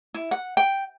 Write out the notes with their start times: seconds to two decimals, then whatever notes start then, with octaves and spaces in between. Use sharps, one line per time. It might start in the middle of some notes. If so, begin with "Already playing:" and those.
0.14 E4
0.31 F#5
0.57 G5